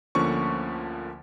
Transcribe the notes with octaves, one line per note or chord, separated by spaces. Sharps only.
D2 D3 F3 A#3 C#4 C#6